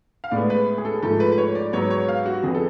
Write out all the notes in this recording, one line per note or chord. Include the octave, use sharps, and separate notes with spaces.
F5
A2 G#3 B3 D5
B4
G#4
A4
G#2 F3 A3 A4
B4
B4
C#5
D5
G#2 F#3 B3 C#5
C#5
F5
F#4
F2 F3 B3 G#4
A4